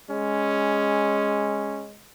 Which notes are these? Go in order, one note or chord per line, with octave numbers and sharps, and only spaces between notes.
G#3 C#4